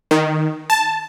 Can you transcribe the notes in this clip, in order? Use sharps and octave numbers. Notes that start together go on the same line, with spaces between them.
D#3
A5